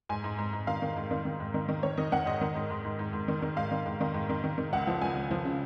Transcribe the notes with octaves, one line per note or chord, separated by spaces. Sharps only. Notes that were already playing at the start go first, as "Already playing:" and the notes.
G#2 G#5
G#2
G#2
G#2
D#3 F5
D#3
G#2
D#3
D#3
G#2
D#3
D#3
D#3 C#5
D#3 D#5
D#3 F#5
G#2 D#5
D#3
G#2
G#2
G#2
G#2
G#2
D#3
D#3
G#2 F5
D#3
G#2
D#3
G#2
D#3
D#3
D#3
C#2 F#5
F3
C#2 G#5
C#2
F3
C#3